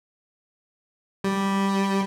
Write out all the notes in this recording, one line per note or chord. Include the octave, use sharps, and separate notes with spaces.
G3